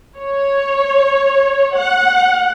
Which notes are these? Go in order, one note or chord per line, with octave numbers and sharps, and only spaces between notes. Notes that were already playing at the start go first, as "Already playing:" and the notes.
C#5
F#5